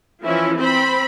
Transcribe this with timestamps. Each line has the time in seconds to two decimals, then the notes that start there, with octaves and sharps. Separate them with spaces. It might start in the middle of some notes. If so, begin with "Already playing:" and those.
0.24 E3 F3 C#4 E4
0.58 C4 C5 B5